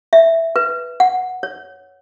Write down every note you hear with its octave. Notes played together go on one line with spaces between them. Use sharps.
E5
B4
F#5
C#5